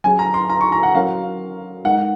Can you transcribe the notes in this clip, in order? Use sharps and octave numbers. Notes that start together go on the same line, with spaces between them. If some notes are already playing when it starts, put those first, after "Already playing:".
F#3 C#4 G#4 G#5
A#5
C6
A#5
C#6
A#5
F#5
F#3 C#4 F#4 A#4 F5
G#3 D#4 A#4 F#5